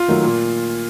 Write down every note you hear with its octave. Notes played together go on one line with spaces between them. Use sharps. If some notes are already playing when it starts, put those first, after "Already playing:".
Already playing: F4
D#3 F#3 A3
A#2